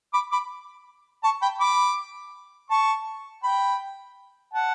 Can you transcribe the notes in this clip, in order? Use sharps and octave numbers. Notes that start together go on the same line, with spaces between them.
B5 D6
B5 D6
A5 C#6
G5 B5
B5 D6
A5 C#6
G5 B5
F#5 A5